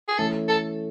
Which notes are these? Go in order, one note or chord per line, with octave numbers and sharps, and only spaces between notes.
G#4
E3 A3 C#4 A4
A4